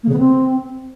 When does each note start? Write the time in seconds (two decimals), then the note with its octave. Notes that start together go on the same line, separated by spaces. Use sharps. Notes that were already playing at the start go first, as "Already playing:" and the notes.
0.03 A#3
0.08 C#3
0.13 B3
0.18 C4